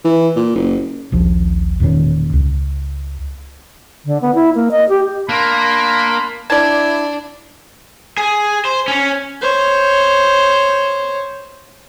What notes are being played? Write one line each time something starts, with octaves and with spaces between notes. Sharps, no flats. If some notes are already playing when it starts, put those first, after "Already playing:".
E3
A#2
F#1
D#1 A#1 F3
E1 A#2 D#3 C#4
C#2
D3
B3
E4
A#3
D#5
G4
A#3 D4 B5 C6
D4 E4 D5 A5 G#6
G#4
C5
C#4 C#5
C5 C#5